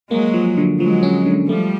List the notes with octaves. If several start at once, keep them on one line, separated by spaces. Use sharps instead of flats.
F#3 G#3 A#3
F3
D3
F3 F#3 G#3
C#4
D3
F3 G3 A3